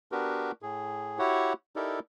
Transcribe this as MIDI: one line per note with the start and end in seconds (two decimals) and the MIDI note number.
0.12 0.52 59
0.12 0.52 62
0.12 0.52 66
0.12 0.52 67
0.12 0.52 70
0.12 0.52 71
0.62 1.19 45
0.62 1.19 68
1.19 1.53 64
1.19 1.53 66
1.19 1.53 67
1.19 1.53 73
1.19 1.53 78
1.76 1.99 63
1.76 1.99 64
1.76 1.99 67
1.76 1.99 69
1.76 1.99 70
1.76 1.99 74